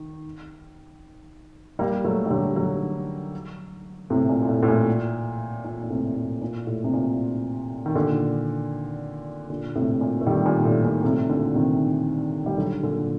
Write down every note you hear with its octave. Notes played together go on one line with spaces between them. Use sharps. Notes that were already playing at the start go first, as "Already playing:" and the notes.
Already playing: D#3
G3 A#3
F#3 A3
G3
D3 F#3
D3 F#3
A2 C3
A#2
A#2
A2
A2
A#2
A#2
A#2
A2 C3
A2
A#2
A2
C3
A#2
D#3
A#2 D3
A#2 D3
A2 C3
A#2
A3
D#3 G3
A#2
A2
A#2
A2 C3
A#2 D3
C3 D#3
G3
D3 F#3
A#2 D3